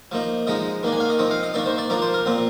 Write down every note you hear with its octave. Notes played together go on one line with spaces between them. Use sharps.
F3 A#3 D#4
F3 G#3 D#4 D#5
D#3 A#3 D4
G#5
F5
D#5
F3 C4 D#4
F5
D#5
D#3 A#3 D4 D5
C5
D5
F3 A#3 D4 A#4
C5
A#4
A#2 F3 C4